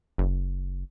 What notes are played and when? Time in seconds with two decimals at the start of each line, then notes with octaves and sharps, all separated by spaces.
0.18 F#1